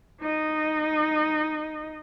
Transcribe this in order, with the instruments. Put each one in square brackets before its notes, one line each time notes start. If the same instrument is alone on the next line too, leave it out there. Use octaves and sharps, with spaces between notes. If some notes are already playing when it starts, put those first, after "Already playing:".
[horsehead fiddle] D#4 D#5